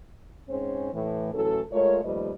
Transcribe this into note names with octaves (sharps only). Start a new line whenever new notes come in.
G#2 C4 C#4 G#4 C5 C#5
A2 E3
A2 E3 F#3 C#4 A4
G#3 A3 F4 A#4 C#5
D#2 F3 G3 A3 B4 D#5